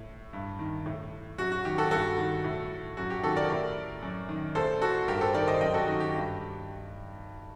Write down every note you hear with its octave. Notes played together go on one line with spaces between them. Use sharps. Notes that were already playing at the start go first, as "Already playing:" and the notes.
Already playing: A2
G2
D#3
A2
F#2 F#4
F#4
D#3 G4
F#4 A4
G2 F#4 A4
D#3
A2
F#2 F#4
G4
D#3 F#4 A4
A#4 D5
A2
F#2
D#3
A2 A4 C5
F#4 A4
G2 G4 A#4
A4 C5
D#3 A#4 D5
C5 D#5
F#2 D#5 G5
F#4 A4
D#3 F#4
G4
G2